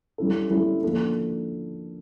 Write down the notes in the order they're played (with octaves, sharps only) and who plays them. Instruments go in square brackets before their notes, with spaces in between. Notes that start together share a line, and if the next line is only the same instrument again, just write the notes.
[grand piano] G3 C#4 E4 A4
G3 C#4 E4 A4
F3 A#3 D4 A4